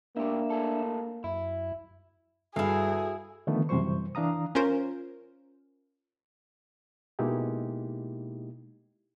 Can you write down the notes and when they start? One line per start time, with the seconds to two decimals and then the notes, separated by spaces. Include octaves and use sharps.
0.17 C#2 A2 A#3 D4 G4 E5
0.50 A2 G#4 A4
1.24 F#2 E4
2.56 G2 E4 F#4 G#4 A4 E5 F5
3.47 D3 D#3 F3 A3 B3
3.69 F#2 C3 E3 G3 C5 C#6
4.15 E3 D4 F5 A#5 D#6
4.55 C#4 F4 A#4 C5
7.19 B2 G#3 A#3 D#4 E4 G4